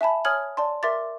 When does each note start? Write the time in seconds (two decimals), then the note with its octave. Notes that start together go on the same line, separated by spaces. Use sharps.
0.01 E5 G#5 A5 B5
0.25 C#5 G#5 D#6 F6 G#6 F#7
0.57 D5 A5 C6
0.83 A#4 E5 C6 D6 A6